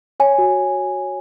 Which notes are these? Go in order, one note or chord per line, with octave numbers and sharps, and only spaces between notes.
C#5 G#5
F#4